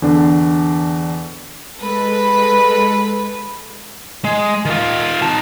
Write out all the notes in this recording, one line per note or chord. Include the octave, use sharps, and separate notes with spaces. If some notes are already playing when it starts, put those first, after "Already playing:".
E2 D3 D4
G#3 A4 B4
G#3
D#3 F4
D#4 A5